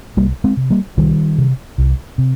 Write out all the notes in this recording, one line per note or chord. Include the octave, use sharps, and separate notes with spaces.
C2 G3 A#3
G#3 C4
C3
G3 A#3
C2 D#3 G3
C3
C2
C3